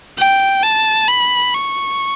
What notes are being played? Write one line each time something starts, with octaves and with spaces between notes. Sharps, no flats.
G5
A5
B5
C#6